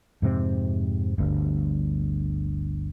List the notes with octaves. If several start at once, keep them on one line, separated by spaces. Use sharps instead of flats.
F2 G#2 C3 C4
G1 D2 G2